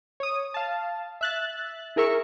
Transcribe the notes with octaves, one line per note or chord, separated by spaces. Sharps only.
C#5 D#6
F5 A5
E5 F#6 A6
E4 G#4 A#4 E5 C#6